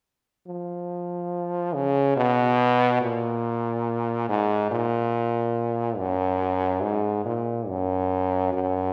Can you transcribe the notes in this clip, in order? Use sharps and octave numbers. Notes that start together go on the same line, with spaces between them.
F3
C#3
B2
A#2
G#2
A#2
F#2
G#2
A#2
F#2
F#2